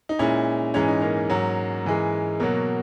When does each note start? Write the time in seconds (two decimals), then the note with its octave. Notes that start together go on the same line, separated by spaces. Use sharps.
0.09 D#4
0.19 A#2 G#3 C#4 E4
0.74 G#2 E3 G#3 C#4
0.88 D#4
1.01 A#3 C#4
1.30 G#2 F#3
1.85 G#2 E3 G#3
2.40 B2 F#3 A#3